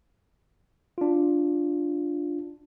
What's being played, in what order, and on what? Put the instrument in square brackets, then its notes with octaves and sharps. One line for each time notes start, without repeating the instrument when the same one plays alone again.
[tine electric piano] D4 F4